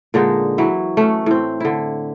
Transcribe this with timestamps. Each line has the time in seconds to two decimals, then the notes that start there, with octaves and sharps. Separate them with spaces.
0.14 A#2 D3 G#3 D#4
0.58 E3 F#3 E4
0.97 A3 C#4
1.26 A2 C4
1.60 D3 E4